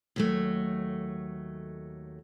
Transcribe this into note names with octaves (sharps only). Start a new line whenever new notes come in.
D#2 F#3 A3